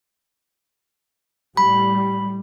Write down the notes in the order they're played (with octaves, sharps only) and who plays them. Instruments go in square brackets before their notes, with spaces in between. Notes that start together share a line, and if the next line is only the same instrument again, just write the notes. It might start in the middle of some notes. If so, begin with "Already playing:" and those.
[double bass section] A2 G3 [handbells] B5